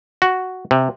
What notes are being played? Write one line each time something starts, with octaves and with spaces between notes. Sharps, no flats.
F#4
C3